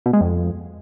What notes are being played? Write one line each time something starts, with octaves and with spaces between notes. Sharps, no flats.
B2
G#3
F2